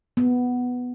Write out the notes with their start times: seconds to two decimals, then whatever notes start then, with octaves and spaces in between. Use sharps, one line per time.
0.17 B3